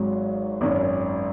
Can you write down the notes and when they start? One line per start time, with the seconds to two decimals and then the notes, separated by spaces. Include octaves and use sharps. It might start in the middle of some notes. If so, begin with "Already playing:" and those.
Already playing: G#1 G#2 F#3
0.61 G#1 F#2 D#3